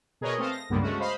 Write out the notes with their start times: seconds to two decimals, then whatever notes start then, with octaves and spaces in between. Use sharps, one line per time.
0.21 B2 G#4 A#4 B4 C#5 D#5
0.38 A3 C4 A4 C5 D#5 F5
0.51 A#6
0.69 C#2 G2 D3 G3 A#3 B3
0.82 G#3 A3 C#4 F#4
1.00 C5 D#5 F5 B5 C6